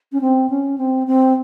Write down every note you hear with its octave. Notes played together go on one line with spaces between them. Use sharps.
C#4
C4
C#4
C4
C4